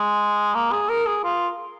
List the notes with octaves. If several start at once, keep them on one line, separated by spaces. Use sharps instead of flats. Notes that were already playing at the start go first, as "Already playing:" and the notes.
Already playing: G#3
A#3
G#4
A#4
G#4
F4